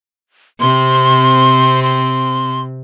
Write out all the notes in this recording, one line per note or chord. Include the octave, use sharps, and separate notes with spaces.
C3 C4 C6
C6